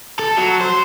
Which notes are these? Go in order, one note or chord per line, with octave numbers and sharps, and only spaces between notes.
A4
F#3
C5